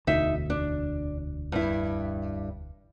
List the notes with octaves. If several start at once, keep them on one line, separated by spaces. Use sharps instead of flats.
E1 D2 D#4 E5
D4
G2 E4